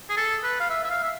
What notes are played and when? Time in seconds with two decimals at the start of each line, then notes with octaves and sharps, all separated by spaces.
0.10 G#4
0.17 A4
0.44 B4
0.60 F5
0.70 E5
0.84 E5
0.90 F5
1.04 E5